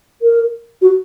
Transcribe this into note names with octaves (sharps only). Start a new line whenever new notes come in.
A#4
F#4